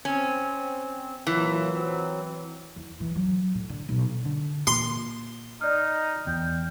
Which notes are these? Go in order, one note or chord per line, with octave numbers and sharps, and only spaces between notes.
C4 C#4
A#2 E3 F#3
F#3 C4
E2
E3
F#3
A2
D3
B1
D3
A#2 C6
D#4 D5 F6
E2 G5